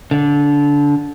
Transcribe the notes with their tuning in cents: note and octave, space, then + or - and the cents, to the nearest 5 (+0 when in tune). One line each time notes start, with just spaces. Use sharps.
D3 -20